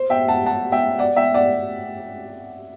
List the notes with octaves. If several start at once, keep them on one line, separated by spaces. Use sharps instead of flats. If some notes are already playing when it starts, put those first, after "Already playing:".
Already playing: C5
E5 G5
F#5 A5
F#5 A5
E5 G5
D5 F#5
E5 G5
D5 F#5